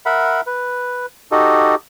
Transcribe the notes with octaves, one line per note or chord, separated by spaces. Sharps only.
A#4 E5 F#5 B5
B4
D#4 F#4 G4 A4 D#5